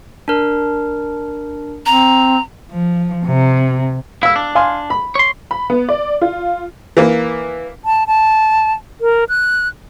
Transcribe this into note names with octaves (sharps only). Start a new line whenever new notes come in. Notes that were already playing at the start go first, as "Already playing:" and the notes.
D4 A#4
C4 A#5
F3
C3
E4 F5 E6
D4
F5 G#5 C6
B5
C#5 C6
B5
B3
D5
F4
E3 A#3
A5
A5
A#4
F#6